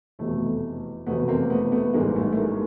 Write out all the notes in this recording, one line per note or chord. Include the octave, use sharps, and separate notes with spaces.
F1 E2 B2 A3
F1 E2 B2 A3 B3
A#3 C4
A3 B3
A3 B3
A1 G#2 E3 G3 G#3 A#3
A3
A3
G#3 A#3